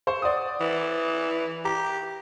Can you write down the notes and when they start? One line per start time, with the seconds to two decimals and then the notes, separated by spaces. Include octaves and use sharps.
0.07 C5 C6 C#6
0.22 D5 F#5 D#6
0.61 E3
1.65 G4 A#5